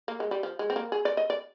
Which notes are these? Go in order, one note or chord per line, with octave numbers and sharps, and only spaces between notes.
A#3
G#3
G3
F3
G#3
C4
A#3
G#4
D5
D#5
D5